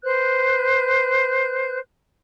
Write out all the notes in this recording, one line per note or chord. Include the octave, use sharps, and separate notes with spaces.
B4 C5 F#6 G6